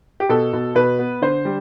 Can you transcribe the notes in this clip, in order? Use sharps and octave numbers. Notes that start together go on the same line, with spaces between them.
G4
B2 A4
B2
B2 B4
B3
D3 C5
G3